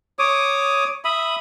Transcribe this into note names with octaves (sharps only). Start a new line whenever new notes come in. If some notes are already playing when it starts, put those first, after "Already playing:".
C#5 D6 D#6
E5 B5 D#6